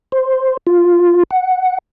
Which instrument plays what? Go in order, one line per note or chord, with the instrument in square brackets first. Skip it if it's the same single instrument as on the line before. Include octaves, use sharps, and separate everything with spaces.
[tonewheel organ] C5
F4
F#5